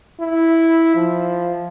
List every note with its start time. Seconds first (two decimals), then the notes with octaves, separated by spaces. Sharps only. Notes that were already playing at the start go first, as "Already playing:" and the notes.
0.21 E4
0.96 F3